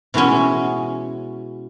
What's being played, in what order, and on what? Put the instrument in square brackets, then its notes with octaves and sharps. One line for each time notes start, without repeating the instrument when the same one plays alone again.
[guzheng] B2 E3 G#3 B3 C#4